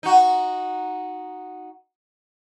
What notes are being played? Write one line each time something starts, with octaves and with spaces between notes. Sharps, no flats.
D#4 F#4